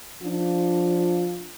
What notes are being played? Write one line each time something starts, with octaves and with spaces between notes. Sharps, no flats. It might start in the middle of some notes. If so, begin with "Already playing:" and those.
F3 D4 F4